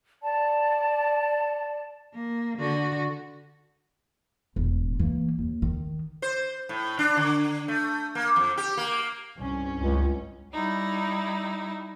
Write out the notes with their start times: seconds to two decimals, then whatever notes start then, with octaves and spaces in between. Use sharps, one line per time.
0.23 D5 A5
2.14 A#3
2.58 D3 F#4
4.56 E1 A2
5.00 E3 A#3
5.39 D#2
5.62 D#3
6.22 C5
6.69 A2
6.99 D4
7.17 D3
7.68 A3
8.15 A#3
8.36 F2
8.57 G4
8.77 A#3
9.37 C2 G2 C#4
9.77 C#2
10.53 G3 D#4 E4